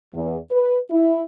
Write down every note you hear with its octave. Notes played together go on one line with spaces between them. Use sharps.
E2
B4
E4